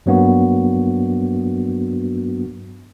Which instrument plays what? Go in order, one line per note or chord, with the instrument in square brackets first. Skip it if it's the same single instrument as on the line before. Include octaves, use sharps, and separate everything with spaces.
[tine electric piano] G2 F#3 A#3 B3 D4 F#4